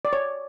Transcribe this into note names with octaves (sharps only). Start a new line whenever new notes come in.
D5
C#5